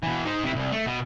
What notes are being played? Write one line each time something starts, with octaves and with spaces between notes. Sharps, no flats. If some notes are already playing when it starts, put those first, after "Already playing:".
B2 E3
D#4 C5
C3 E4
C2
A3
B2